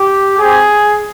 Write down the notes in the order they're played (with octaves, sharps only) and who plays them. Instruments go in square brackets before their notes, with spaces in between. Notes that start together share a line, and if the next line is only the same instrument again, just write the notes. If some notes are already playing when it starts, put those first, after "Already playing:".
Already playing: [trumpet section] G4
C4 G4 G#4